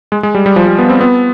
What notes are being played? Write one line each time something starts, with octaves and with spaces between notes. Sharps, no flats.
G#3
G#3
G3
G3
F3
G3
B3
C4
B3